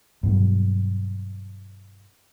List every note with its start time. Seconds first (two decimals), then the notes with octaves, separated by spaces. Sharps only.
0.23 G2 B2 F#3